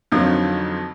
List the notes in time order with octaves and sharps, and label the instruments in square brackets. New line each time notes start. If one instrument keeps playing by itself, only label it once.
[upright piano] F2 D3 D#3 F3 F#3